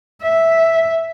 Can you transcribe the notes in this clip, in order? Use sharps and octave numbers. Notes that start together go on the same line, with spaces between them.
E5